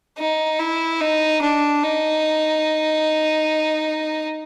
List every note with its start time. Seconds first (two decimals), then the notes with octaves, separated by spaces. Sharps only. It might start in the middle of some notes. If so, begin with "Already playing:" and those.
0.18 D#4
0.59 E4
1.01 D#4
1.42 D4
1.83 D#4